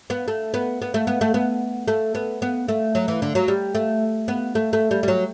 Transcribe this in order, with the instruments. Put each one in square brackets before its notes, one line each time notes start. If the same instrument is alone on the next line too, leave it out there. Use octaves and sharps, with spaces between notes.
[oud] B3
A3
B3
B3
A3
B3
A3
B3
A3
B3
B3
A3
F#3
E3
D3
F#3
G3
A3
B3
A3
A3
G3
G3
F#3